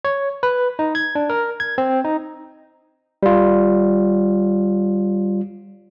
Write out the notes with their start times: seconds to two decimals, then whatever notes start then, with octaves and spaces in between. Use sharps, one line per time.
0.05 C#5
0.43 B4
0.79 D#4
0.95 G#6
1.15 D4
1.30 A#4
1.60 G#6
1.78 C4
2.04 D#4
3.23 G3 F4